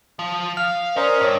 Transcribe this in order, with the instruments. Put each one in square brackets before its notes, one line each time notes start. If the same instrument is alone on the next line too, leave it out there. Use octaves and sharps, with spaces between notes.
[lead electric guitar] F3
[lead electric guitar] F5 [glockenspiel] F6
[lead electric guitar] C#4 [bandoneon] A#4 C5 D#5 [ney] D5
[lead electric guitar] G2 [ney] C#5